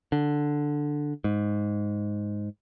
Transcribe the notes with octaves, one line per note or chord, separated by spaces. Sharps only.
D3
G#2